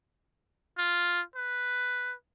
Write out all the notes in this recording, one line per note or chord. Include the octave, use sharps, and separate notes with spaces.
F4
B4